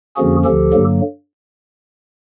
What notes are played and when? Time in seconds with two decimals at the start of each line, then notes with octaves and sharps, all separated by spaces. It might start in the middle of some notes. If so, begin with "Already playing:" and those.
0.16 F2 D3 F3 A#3 C#4 F#4 G#4
0.45 D2 D3 F3 G4 A4
0.73 G2 D3 F#3 A#3